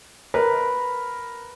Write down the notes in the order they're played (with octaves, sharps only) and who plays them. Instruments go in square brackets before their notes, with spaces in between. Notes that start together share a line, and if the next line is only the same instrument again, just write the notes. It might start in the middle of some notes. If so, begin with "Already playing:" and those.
[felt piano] A#4 [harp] B4